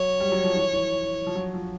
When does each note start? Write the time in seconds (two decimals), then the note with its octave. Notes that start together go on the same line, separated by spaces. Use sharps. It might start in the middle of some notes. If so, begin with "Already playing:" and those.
Already playing: F#3 C#5
0.20 G3
0.32 F#3
0.44 F3
0.56 E3
0.73 E3
1.27 F3
1.35 F#3
1.54 F3